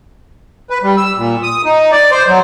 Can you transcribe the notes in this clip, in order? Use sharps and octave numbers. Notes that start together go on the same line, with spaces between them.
B4
G3
E6
A#2
D#6
D#4
D5
C5
F#3